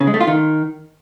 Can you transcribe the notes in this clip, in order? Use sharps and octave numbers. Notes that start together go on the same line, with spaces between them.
C#3
G#3
A3
F4
D#3